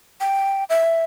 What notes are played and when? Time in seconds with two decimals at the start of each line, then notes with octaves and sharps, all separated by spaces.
0.20 G5
0.70 E5